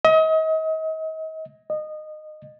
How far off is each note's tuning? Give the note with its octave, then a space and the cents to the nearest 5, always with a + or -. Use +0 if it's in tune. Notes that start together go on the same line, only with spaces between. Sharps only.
D#5 +35
D#5 -20